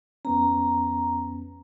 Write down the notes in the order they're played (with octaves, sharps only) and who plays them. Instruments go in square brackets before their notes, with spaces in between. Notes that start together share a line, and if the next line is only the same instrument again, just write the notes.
[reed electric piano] F2 B3 C#4 [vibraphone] A#5